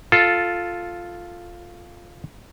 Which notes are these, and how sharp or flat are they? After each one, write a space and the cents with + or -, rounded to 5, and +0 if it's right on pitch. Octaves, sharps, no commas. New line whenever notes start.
F4 +0 A4 +0